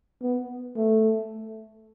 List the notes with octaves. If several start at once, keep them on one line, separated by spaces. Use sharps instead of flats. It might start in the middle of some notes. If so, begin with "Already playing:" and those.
B3
A3